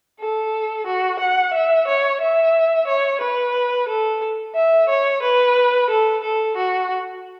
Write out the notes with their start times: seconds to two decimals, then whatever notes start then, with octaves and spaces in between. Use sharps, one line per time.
0.20 A4
0.86 F#4
1.20 F#5
1.53 E5
1.88 C#5
2.21 E5
2.87 C#5
3.21 B4
3.88 A4
4.55 E5
4.89 C#5
5.23 B4
5.90 A4
6.23 A4
6.57 F#4